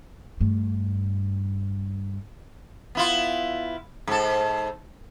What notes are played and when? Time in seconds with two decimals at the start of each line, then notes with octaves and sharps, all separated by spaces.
0.41 G2 A3
2.95 B3 E4 F4
4.07 G#2 A4